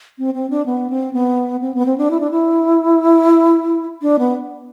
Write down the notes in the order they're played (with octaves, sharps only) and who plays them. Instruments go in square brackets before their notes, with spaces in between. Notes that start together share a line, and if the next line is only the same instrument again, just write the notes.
[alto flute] C4
C4
D4
B3
C4
B3
C4
B3
C4
D4
E4
D4
E4
D4
B3